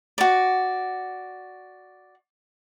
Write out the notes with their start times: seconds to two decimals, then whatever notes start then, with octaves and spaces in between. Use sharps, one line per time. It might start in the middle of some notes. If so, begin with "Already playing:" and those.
0.18 F#4 D5